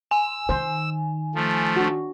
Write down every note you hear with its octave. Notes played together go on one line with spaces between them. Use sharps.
G#5 E6
D#3 C5
F3 A3
D4 F#4